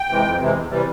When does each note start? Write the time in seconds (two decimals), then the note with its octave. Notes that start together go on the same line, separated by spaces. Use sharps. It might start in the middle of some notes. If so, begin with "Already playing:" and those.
Already playing: G5
0.08 C3 E3 G#3
0.23 F2
0.39 C3 E3 G#3
0.54 E2
0.70 C3 E3 G3